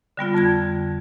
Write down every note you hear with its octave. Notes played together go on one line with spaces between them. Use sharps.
D3 G3 B3 F4
F2 D3 A5 G#6